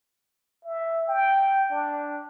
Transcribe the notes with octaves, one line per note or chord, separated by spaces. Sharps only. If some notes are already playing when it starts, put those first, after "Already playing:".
E5
G5
D4